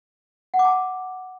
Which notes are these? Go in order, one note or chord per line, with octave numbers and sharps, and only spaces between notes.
F#5
D6
A5